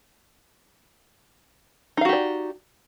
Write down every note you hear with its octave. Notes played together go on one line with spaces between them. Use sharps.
D#4 F#4 G4 D5 F5